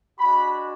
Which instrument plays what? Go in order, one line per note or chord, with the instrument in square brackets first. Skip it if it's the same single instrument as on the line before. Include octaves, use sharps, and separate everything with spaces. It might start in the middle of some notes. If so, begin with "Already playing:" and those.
[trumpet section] G#3 D4 F#4 B5